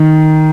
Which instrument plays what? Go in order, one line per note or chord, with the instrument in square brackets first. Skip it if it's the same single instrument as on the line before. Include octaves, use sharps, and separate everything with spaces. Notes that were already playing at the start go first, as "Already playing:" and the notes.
Already playing: [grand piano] D#3